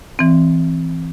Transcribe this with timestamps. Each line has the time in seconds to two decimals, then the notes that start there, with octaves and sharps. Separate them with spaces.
0.19 E3 C4